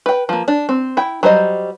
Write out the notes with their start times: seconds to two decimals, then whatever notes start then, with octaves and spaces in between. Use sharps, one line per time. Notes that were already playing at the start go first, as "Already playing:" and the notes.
0.06 B4 G5
0.29 F3 A#3
0.48 D4
0.69 C4
0.97 E4 G5
1.23 F#3 G3 C5 D#5